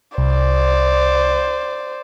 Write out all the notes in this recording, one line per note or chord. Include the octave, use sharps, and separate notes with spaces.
C2 C5 D5